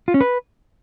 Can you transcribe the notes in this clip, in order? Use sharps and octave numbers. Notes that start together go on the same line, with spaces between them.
F4
C#4
B4